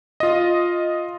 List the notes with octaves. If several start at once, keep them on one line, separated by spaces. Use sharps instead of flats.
F4 D#5